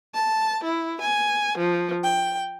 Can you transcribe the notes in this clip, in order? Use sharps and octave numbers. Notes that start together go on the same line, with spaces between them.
A5
E4
G#5
F3
G5